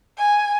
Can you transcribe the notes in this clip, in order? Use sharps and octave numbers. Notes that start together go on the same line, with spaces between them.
G#5